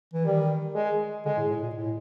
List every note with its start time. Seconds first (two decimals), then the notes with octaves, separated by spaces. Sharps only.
0.14 E3
0.25 D#3 G3
0.75 G#3
1.25 D3 G#3
1.37 A2
1.50 A2
1.62 A#2
1.75 A2